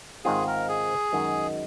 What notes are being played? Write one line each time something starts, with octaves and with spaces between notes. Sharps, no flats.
G#2 D#3 G#3 C4 F4 G#4
A#4
G#4
F#2 D#3 G#3